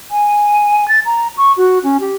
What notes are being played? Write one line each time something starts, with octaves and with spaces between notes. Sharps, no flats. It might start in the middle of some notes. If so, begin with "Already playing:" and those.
G#5
A6
A#5
C#6
F#4
C#4
G4